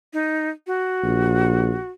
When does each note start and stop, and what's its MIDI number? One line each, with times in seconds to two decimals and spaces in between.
0.13 0.50 63
0.67 1.89 66
1.03 1.76 34